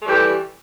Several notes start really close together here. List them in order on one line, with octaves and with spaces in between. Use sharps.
A3 G3 E3 G4